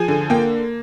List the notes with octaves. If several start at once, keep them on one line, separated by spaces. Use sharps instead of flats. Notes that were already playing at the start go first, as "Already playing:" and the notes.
Already playing: F3 G#4 G#5
D3
A#3 G5